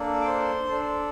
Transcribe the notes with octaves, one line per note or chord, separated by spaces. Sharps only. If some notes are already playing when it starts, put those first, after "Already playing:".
Already playing: A#3 D4 A4
D6
C5 C6
D4 A4